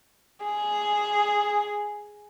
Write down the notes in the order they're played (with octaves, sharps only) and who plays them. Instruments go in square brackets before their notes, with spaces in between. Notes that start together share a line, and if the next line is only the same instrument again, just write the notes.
[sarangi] G#4